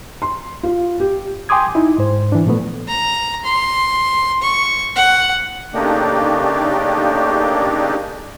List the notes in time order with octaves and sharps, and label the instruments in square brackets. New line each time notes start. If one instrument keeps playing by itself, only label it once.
[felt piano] C6
F4
G4
[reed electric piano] G5 G#5 C6 D6 D#6 G#6
D#4 E4
G#2 C5
E3 D4
A#2 F3 A3 B3
[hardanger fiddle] A#5
C6
C#6
F#5
[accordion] C#3 A3 A#3 D4 D#4 G4